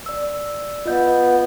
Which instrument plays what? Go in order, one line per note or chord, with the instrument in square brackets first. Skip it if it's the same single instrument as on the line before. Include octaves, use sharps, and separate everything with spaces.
[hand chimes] D5 E6
[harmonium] B3 [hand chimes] F4 D#5 G6